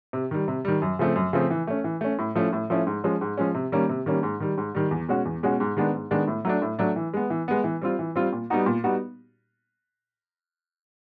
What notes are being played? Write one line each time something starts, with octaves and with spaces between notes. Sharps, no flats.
C3
D#3 G3
C3
D#3 G3
F#2
C#3 F3 A3 C4
F#2
C#3 F3 A3 C4
E3
A3 C#4
E3
A3 C#4
A2
F3 A3 C#4 E4
A2
F3 A3 C#4 E4
G#2
F3 G#3 C#4
G#2
F3 G#3 C#4
C3
D#3 G3 A#3 C#4
C3
D#3 G3 A#3 C#4
G#2
D#3 G3
G#2
D#3 G3
E2
B2 G#3 C#4 F#4
E2
B2 G#3 C#4 F#4
G#2
D#3 G#3 B3 D4
G#2
D#3 G#3 B3 D4
A2
F#3 A3 D4
A2
F#3 A3 D4
E3
G#3 B3
E3
G#3 B3
E3
G3 C4 F4
E3
G3 C4 F4
A#2
G3 B3 D#4 F#4
A#2
G3 B3 D#4 F#4